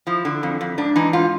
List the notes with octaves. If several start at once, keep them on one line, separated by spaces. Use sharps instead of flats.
F3 E4
D3
F2
F2
G#2 D4
E3 D#4
G#2 F4